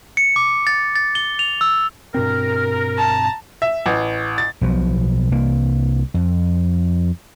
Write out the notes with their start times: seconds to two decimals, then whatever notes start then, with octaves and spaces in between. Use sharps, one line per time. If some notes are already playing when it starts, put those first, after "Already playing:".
0.17 C#7
0.36 D6
0.67 A6
0.96 A6
1.15 G7
1.39 F7
1.61 E6
2.14 G2 B2 C4 A#4
2.96 A5 A#5
3.62 E5
3.86 A1
4.38 A6
4.61 B1 B2 F3
5.31 C2 A#3
6.14 F2